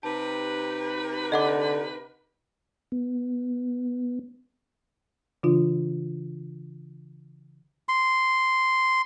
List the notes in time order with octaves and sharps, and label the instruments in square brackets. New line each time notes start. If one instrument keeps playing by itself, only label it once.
[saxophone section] C3 G4 B4 [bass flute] D#4 [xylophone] A5
[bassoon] D3 [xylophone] D#5 F#5 D6
[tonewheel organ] B3
[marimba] C#3 E3 D4 F4
[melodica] C6